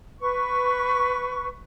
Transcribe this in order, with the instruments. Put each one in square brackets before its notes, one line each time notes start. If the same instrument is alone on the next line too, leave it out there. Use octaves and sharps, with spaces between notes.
[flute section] B4 C#6